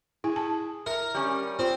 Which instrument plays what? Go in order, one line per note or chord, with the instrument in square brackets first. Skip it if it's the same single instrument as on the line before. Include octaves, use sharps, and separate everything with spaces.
[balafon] E4 [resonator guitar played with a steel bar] G#4
[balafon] A5
[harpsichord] A#4 [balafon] E5
[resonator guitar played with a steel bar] G3 C#4
[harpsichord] C4 [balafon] F4